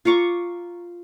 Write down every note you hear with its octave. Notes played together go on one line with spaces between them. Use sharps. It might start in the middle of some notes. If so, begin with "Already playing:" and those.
F4 A#5 C#6 D6